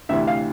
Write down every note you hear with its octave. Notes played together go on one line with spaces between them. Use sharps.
D2 C3 E3 E5
F5